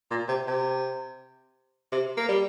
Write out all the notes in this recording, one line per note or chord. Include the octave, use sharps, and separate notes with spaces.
A#2
C3
C3
C3
A#3
G3